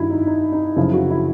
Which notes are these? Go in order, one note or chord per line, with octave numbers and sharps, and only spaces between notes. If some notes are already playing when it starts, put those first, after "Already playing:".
Already playing: G2 D#3 E4 F#4
D#4
D#4
D#4
F#2 C#3 F3 E4
F#4
E4